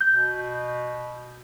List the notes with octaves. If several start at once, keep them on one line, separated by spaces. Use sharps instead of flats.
G6
B2